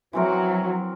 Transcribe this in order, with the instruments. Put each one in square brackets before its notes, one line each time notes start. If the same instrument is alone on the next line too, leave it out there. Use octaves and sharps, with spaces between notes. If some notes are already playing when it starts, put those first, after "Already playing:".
[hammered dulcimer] E3 C4 A#4 [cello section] F#3